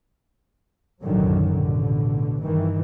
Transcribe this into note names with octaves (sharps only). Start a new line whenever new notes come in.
B1 F#2 A2 D3 D#3 F#3
A1 B2 D3
G2 D#3 E3